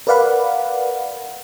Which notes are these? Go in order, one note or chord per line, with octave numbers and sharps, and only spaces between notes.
A#4 B4 D5 F5 F#5 B5